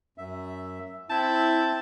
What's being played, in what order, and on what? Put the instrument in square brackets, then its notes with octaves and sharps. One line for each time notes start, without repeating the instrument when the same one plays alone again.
[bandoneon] F#2 E5
[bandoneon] C4 G6 [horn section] E4 [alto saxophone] A5